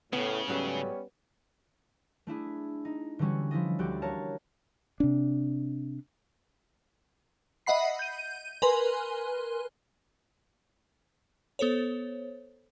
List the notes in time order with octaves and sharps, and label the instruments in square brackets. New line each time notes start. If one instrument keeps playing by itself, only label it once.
[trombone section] A2 [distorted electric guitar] C#3 [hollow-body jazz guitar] B3
[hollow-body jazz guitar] G#2 F#3 A3 [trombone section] G3 B3 C#4
[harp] A3 D4 E4 G#4
D#4
D3 E3 G3 C#4 F#4
F3 E4 A4 D#5
D2 F#4 G4 D5 D6
A#3 A#4 C#5 A5
[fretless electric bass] C3 D4
[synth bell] D#5 E5 F#5 B5 C7
G6 D#7
A#4 B4 G#5 C6
B3 A4 C5 C#5